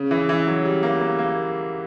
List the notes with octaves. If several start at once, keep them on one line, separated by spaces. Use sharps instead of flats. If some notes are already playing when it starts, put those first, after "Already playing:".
Already playing: C#3
E3
E3
F#3
G3
A#3
A#3
A#3